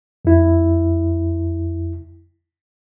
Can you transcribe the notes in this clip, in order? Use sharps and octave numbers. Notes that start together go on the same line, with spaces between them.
F2 E4